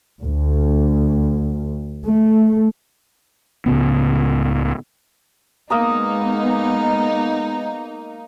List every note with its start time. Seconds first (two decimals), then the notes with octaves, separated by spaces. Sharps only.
0.21 D2
2.06 A3
3.66 C#2 A2 C#3 B3
5.70 G#3 A#3 B3 D#4 D#5 A#5